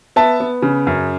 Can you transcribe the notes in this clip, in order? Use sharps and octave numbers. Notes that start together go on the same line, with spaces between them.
B3 E5 A5
B3
C#3
F#2